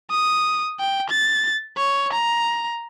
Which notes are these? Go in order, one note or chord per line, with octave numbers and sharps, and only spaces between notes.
D#6
G5
A6
C#5
A#5